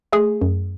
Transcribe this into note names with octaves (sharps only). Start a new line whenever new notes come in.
A3 G#4
F#2